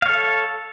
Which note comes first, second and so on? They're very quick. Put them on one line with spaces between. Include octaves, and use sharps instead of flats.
F5 C#5 A4